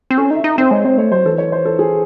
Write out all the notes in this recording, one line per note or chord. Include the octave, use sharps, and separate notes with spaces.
C4
C#4 A4
D#4
E5
D#4
C4 C5
G#3 C#5
C4 C5
A3 C#5
F#3 C5
E3 A4
C#5
C5
A4
G#4